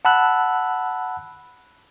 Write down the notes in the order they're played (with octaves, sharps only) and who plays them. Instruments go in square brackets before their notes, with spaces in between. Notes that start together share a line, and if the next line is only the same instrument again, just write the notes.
[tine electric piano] F#5 A5 B5 E6 F#6